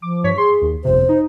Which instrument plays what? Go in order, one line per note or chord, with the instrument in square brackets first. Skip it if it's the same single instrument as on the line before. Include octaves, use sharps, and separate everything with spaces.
[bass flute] F3 [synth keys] D6
[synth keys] G2 C#5 B6
[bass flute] G#4 [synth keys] C6
[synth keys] D#2
[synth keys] G1 F2 C3 [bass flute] C5
[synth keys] D#4